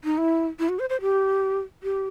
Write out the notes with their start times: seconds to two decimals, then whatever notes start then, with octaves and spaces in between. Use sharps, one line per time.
0.04 D#4
0.18 E4
0.59 E4
0.69 F#4
0.79 C5
0.90 C5
1.01 G4
1.83 G4